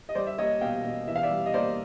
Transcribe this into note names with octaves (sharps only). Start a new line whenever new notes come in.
D#5
G3 C5 D5
E5
A#3 C#5 D#5
B2 F5 G5
B2
E3 E5
F5
D5 E5
G3
D#5
A#3 C5 D5